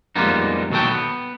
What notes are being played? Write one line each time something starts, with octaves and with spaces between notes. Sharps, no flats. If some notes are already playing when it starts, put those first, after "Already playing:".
F2 G3 G#3 A#3 B3 D#4
D#2 B2 F#3 A4 G5
B3